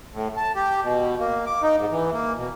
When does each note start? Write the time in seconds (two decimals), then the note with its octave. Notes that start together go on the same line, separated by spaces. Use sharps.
0.14 A2
0.37 A5
0.56 G4
0.83 B2
1.19 A#3
1.47 D6
1.63 D#4
1.77 G#2
1.91 E3
2.13 A#3
2.36 B2